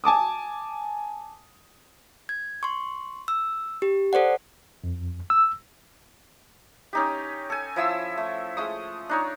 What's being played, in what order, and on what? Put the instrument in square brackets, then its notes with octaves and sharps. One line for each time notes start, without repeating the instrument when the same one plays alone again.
[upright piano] G#5 A5 D6 D#6
[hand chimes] G#6
C6 C#6
E6
G4
A4 C5 D5 F#5
[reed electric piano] F2
E6
[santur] C#4 D#4 G4
A4 G#5
F3 E4 E5 E6
A3
G#3 A3 D#6
D4 D#4 C#5